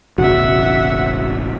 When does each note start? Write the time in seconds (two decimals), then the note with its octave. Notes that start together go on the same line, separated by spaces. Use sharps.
0.18 E1 A1 C#3 F#4 E5 F#5